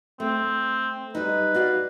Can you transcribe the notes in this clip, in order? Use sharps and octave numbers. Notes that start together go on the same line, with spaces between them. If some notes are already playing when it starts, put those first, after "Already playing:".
A3 C4
G3 D#4 B4
F#4 D5 F5